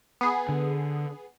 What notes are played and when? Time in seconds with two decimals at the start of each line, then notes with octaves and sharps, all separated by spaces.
0.21 B3 G#4
0.49 D3